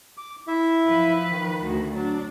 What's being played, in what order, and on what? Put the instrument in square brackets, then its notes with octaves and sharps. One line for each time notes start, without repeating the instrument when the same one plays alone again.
[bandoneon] D6
E4 E5
[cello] F3 B4
[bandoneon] D#3
[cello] D2 F#4
[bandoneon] F#3 [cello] D4